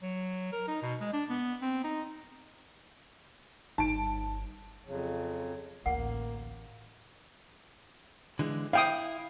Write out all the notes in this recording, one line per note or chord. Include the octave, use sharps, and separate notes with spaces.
F#3
A#4
D#4
B2
G#3
D4
B3
C4
D#4
G1 G2 D#4 A5 D7
F2 C#3 F#3
A1 D2 A#3 F#5
D3 E3 G#3
E4 F5 G5 D#6